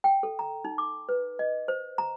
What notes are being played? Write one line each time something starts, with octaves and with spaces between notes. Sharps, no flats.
G5
A4
A#5
D#4
D6
B4
D#5
C5
A#5